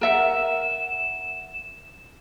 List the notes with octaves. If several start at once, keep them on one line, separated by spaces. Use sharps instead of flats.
A#4 E5 F#5 E7